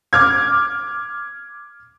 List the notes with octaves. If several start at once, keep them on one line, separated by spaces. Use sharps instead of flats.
D6 F6 G#6